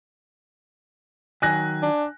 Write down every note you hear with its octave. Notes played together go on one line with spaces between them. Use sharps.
D#3 F#3 G#5 F#6 A#6
D4